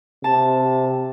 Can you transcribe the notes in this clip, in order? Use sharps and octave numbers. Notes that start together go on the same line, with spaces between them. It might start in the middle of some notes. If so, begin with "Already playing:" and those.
C3 A5